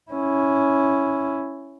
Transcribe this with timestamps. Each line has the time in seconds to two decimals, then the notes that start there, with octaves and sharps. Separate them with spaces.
0.11 C#4 E4